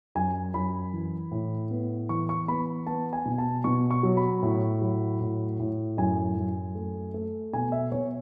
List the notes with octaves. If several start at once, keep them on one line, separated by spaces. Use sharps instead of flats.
F#2 G#5
F#2 B5
E3
A2
B3
E3 C#6
C#6
B3 B5
B3 A5
G#5
B2
A5
B2 C#6
C#6
F#3
B5
A2
F#3
A2
A2
F#2 G#5
F#2
A3
A3
B2 G#5
E5
B2 C#5